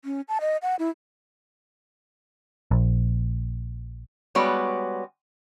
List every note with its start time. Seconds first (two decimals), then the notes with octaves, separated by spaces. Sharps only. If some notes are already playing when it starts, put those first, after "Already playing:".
0.05 C#4
0.28 A5
0.41 D#5
0.62 F#5
0.79 E4
2.71 A#1
4.35 G3 G#3 B3 F#4 C#5 D5